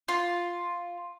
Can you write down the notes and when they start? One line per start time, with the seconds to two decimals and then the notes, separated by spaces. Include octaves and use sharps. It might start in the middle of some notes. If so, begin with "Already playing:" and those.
0.08 F4